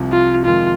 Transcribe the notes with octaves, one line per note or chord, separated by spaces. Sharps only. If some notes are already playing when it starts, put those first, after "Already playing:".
Already playing: C2 C3 F3
F4
F2 C3 D#3 G#3 F4